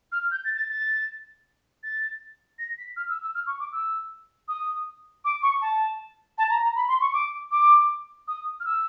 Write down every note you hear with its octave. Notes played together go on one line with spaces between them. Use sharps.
F6
G6
A6
A6
A6
A6
A#6
B6
F6
E6
E6
F6
C#6
D6
E6
D#6
D6
C#6
A5
A5
A#5
A#5
B5
C6
C#6
D6
D6
D#6
F6
E6